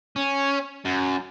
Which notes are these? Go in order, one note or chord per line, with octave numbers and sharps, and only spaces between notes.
C#4
F#2